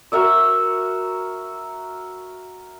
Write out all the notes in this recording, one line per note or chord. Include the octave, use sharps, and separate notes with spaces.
F#4 A#4 E5 E6